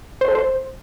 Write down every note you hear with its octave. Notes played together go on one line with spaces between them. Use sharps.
C5
A4
C5